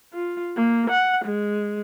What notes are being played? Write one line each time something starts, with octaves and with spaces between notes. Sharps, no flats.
F4
A#3
F#5
G#3